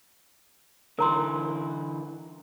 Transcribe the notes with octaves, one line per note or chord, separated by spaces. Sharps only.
D3 E3 A#4 A#5 C6